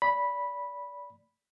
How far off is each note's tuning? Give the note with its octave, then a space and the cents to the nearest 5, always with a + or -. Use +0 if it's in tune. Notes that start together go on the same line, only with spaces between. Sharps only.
D5 -25 B5 -10